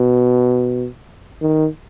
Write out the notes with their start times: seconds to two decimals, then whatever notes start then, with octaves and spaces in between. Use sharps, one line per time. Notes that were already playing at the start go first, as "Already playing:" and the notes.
Already playing: B2
1.42 D#3